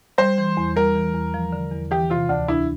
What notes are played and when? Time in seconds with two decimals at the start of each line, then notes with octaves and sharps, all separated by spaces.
0.18 G3 C5
0.38 E3
0.57 E2
0.76 G3 A#4
0.95 E3
1.15 E2
1.34 F3
1.53 D3
1.72 E2
1.91 E3 G4
2.10 C3 F4
2.29 D2 D4
2.48 D4 E4